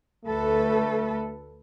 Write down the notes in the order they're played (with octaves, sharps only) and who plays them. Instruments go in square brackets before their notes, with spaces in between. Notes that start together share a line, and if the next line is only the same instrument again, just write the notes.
[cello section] D2 A4 B4 [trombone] A3